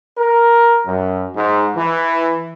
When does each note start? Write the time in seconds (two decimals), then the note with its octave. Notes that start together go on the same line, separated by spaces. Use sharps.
0.18 A#4
0.86 F#2
1.36 G#2
1.76 E3